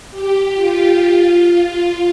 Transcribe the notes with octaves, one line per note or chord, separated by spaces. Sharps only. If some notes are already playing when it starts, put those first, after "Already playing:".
G4
F4
F4